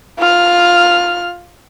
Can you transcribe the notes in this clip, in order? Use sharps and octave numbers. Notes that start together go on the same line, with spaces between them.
F4 F6